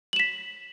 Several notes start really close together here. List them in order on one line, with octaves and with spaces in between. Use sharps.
F#7 E7 B6